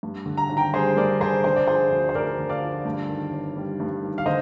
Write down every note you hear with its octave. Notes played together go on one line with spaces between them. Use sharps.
G2
D3
A#5
G#1
G5 A#5
G3 G#4 C5
G2 A#4 D5
D3 G#4 C5
D3 C5
D5
F3 G#4 C5
D2
C5
D2 A#4 D5
D3
D5 F5
F3
G2
D#3
G1
G3
G2
D#3
F5
D3 C5 D#5